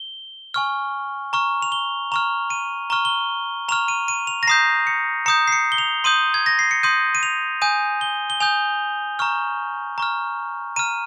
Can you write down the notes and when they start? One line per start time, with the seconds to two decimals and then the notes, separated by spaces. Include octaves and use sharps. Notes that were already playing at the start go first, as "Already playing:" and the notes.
Already playing: G7
0.54 G#5 C#6 F6
1.33 A#5 C#6 F6
1.62 F7
1.72 G7
2.12 A#5 C#6 F6 F7
2.50 D#7
2.90 A#5 C#6 F6 G7
3.05 G7
3.69 A#5 C#6 F6 F7
3.88 D#7
4.08 D#7
4.27 F7
4.43 A#6
4.47 A#5 D#6 G6 C7
4.87 C#7
5.26 A#5 D#6 G6 C#7
5.48 C7
5.52 C#7
5.72 G7
5.78 F7
6.04 C6 D#6 G6 D#7
6.34 G#6
6.46 A#6
6.59 C7
6.71 C#7
6.83 C6 D#6 G6 D#7
7.15 D#7
7.23 F7
7.62 G#5 D#6 G6 D#7
8.01 G7
8.30 G7
8.40 G#5 D#6 G6 F7
9.19 A#5 C#6 F6
9.98 A#5 C#6 F6
10.76 A#5 F6 D#7